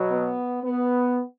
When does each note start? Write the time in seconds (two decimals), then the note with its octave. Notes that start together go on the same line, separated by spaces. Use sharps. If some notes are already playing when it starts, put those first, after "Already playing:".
Already playing: B2 F#3
0.11 B3
0.64 B3